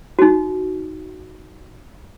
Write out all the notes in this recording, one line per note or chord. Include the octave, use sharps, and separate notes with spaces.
D#4 F#4